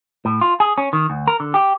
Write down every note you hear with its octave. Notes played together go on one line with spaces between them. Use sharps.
A2
F4
G#4
C#4
D#3
D2
A#4
D3
G4